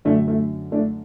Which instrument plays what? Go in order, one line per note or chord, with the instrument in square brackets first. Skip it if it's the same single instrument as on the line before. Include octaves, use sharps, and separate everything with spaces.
[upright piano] F#2 D3 A3 D4
A3
A3 D4